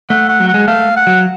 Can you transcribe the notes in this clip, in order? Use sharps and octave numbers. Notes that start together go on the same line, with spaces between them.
A3 F#5
F#5
F#3
F#5
G#3
A3 F5
F#5
F#3